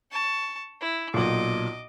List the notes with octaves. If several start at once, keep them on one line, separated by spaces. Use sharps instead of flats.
A5 C#6
E4
B1 A#2 D#5 D6